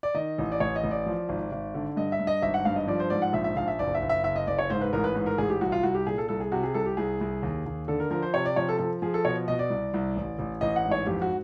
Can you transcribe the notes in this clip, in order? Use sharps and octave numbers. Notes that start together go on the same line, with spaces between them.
D5
D#3 D#5
A1
D5
A1 C#5
D#5
A1
D5
F3
G#1
G#1
D3
G2 D#5
E5
G2
D#5
G#1 E5
F#5
G2 F5
D#5
F3 D5
C5
G#2 D5
F#5
A#1 E5
E5
A#1 F5
E5
F#1 D5
E5
F#1
E5
F#1 E5
D#5
F#1 D5
C#5
G#2 C5
B4
A1 A#4
B4
G#2 B4
A#4
A1 G#4
G4
C2 F#4
F4
C2 F#4
G4
A#2 G#4
A4
C2 A4
G#4
C3 F#4
G#4
C2 A4
G4
C2 G#4
C2
D#2
D#2
D3 A4
A#4
F3 A#4
C5
C3 C#5
D5
F3 C#5
A4
F3 A4
F3 G#4
A4
B2 C#5
B2 D#5
D5
C2
C2
A1
A1
A1 D#5
F#5
G#2
C#5
F2 G4
F#4